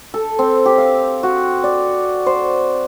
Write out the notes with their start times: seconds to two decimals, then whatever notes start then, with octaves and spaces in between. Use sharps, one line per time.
0.14 A4
0.39 C4
0.66 G4
0.78 F5
1.23 F#4
1.64 D5
2.26 C5